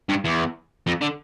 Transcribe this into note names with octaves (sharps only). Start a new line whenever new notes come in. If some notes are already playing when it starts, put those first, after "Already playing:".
G2
E2
F2
D3